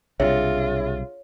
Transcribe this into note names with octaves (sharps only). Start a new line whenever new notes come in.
B1 C3 G3 D4 F4 G#4 C#5 E5